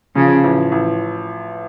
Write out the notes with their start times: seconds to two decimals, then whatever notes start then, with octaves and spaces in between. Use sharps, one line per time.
0.15 C#3 F3
0.43 A1
0.72 A1